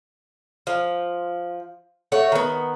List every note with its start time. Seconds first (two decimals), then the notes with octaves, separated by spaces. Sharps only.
0.67 F3
2.12 A3 F#4 C#5
2.32 D#3 B3